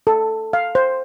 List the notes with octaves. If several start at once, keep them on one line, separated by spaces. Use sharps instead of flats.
A4
F5
C5